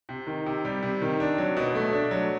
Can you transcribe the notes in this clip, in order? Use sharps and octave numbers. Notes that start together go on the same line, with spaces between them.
C3
D#3
C3
G3
C3
D#3
D4
F#3
B2
A3
D4
F#3